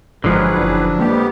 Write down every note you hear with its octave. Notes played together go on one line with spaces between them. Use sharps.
G1 A2 D3 F3 F#3 G#3 G#4 B4
F#1 D4
F2 G#3 A#3 B3 G4